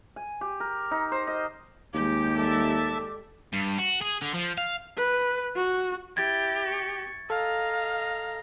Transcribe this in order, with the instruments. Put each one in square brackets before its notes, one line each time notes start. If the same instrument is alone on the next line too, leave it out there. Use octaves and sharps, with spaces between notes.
[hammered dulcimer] G#5
G4
A#4
D#4
C5
D#5
[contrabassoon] D#2 [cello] G#3 G4 [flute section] D6 G6
[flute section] A4 D5 D6 [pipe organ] E5 A5
[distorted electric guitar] G2
F#4
G#4
D3
F3
F5
[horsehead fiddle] B4
F#4
[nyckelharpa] E4 [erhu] G4 [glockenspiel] G#6 A6
[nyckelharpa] C#6
[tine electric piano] A4 [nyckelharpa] D#5 A#5 [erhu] F5